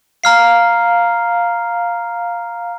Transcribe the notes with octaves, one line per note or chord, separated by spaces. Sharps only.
F5 A#5 F6 C7